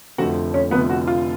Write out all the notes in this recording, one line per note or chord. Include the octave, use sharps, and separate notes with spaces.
F1 F2 D3 F3 A3 F#4 F#5
C#4 C#5
F1 F2 D3 F3 A3 B3 B4
F#4
F4